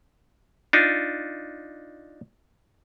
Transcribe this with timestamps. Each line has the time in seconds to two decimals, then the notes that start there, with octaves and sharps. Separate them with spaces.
0.73 D4 D#4 F4